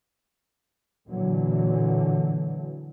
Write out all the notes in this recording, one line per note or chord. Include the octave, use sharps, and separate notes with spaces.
A#2 D3 E3 F#3